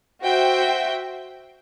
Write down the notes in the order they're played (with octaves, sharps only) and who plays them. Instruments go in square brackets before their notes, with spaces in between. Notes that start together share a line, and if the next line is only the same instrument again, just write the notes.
[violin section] F#4 C5 E5 G5